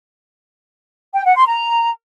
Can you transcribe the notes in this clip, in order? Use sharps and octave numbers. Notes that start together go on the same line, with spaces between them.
G5
F#5
C6
A#5